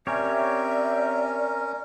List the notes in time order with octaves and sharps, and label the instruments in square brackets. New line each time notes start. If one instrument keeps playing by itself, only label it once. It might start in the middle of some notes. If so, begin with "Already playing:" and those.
[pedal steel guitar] C4 G4 C#5 [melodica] C#4 A#4 [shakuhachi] D5 [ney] E5